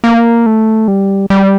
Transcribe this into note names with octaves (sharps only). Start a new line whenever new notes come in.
A#3
A3
G3
G3